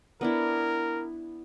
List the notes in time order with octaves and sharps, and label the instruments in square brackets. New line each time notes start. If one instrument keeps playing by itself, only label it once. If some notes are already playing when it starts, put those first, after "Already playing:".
[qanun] B3 D4 E4 [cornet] A#4